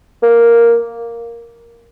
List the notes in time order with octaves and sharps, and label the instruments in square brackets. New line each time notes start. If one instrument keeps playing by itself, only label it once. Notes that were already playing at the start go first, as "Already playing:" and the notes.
[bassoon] A#3